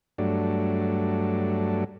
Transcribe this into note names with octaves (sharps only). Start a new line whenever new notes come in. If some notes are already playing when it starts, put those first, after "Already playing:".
G2 F#3 A3 D4